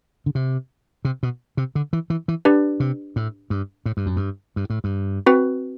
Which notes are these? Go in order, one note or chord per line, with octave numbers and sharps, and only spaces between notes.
D3
C3
C3
B2
C3
D3
E3
E3
E3
D4 G4 B4 D5
C3
A2
G2
A2
G2
F#2
G2
G2
A2
G2
C4 F#4 B4